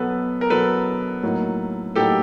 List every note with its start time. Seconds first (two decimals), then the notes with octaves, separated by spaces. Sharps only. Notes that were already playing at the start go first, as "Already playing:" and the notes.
Already playing: B2 F#3 B3 A4 B4
0.41 A#4
0.50 B2 F#3 B3 A4 B4
1.23 A2 F#3 A#3 D#4
1.96 A2 F#3 A#3 D#4 G4 A4